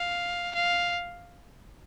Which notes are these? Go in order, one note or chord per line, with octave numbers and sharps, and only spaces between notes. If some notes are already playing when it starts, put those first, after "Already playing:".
Already playing: F5
F5